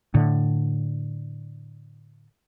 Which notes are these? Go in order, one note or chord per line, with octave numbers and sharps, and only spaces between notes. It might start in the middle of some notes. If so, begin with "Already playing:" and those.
A2 D3